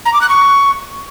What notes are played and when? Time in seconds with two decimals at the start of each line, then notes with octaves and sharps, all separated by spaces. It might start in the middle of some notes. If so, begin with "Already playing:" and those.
0.05 A#5
0.13 D6
0.21 F#6
0.29 C#6